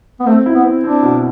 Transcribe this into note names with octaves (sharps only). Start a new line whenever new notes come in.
B3
A3 C4
E4
B3
C4
C4 D4
B2